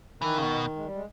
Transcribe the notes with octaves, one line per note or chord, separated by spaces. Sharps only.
D#3 E3
C#3
B2
G#3
G3
G#3